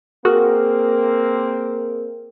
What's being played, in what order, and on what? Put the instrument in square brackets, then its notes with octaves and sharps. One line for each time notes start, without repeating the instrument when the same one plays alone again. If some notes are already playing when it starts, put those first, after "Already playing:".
[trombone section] A#3 C4 [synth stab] F#4 [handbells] G#4 A#4